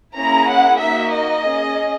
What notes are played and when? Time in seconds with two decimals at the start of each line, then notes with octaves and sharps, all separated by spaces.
0.17 A#3 C#4 E4 G#4 A#5
0.49 F#5
0.81 A#3 D#4 F#4 E5
1.14 D#5
1.45 C#4 G#4